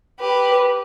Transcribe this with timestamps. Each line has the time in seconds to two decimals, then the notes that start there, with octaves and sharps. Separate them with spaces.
0.20 G4 B4